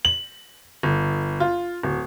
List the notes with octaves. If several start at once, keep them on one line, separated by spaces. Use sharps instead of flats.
F#7
G1
F4
D1